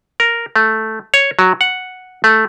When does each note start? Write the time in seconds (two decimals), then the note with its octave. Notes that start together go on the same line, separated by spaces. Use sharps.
0.20 A#4
0.56 A3
1.14 C#5
1.39 F#3
1.61 F#5
2.24 A3